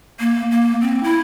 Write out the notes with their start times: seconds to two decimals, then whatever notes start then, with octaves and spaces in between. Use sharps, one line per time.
0.20 A#3
0.51 A#3
0.81 C4
1.03 E4